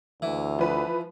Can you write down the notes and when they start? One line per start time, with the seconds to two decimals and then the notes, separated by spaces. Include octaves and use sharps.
0.22 D2 E3
0.59 F3 B4